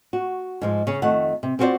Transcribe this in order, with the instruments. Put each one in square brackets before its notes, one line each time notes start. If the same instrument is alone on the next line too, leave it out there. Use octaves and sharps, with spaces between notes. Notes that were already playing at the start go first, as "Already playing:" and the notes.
[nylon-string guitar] F#4
G#2 F3 G#3
C#3 C#4
F2 D#3 A3 F#5
C3
C4 F4 F#4 G#4 C5 D5